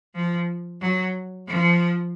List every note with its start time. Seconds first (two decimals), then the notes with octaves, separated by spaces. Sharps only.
0.15 F3
0.82 F#3
1.48 F3